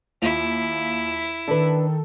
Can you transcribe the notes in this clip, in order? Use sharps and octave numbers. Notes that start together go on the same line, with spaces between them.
D#2 E4 F4
D#3 D4 A4 B4